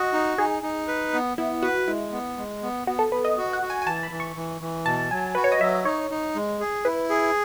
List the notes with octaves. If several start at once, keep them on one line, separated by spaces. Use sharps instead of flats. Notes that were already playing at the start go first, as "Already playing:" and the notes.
Already playing: F#4 D#5
D#4
D#4 G#4
D#4
B4
B3
B3 E4
F#4 B4
G#3 E4
B3
G#3
B3
B3 F#4
A4
B3 B4
D#5
F#4
F#5
F#4
G#5
G#5
E3 A5
B5
E3
C#6
E3
E3
B2 A5
F#3 G#5
F#4 B4
C#5
D#5
F#3 E5
D#4 C#5
D#4
G#3
G#4
E4 B4
G#4